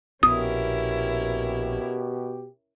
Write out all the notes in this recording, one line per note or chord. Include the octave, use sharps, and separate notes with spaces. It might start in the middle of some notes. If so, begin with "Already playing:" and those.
A#1 B2 B3 C#4 E4 G4 A#4 D#6